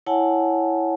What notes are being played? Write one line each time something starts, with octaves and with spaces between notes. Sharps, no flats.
E4 C#5 F#5 G#5 A5